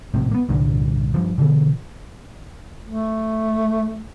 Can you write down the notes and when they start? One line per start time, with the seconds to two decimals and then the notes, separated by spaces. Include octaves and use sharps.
0.14 A#1 A2 C3
0.31 A#3 B3
0.49 C2 G2 A#2 D3
1.14 G2 F3
1.38 B2 D3 E3 B3
2.85 A3